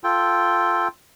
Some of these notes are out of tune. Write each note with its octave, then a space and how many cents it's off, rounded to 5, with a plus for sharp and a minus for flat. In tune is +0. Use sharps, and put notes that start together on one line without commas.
F4 +0 A4 +0 G5 +0